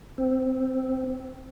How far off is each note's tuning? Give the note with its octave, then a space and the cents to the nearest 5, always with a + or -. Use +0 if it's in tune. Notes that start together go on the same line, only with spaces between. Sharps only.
C4 -10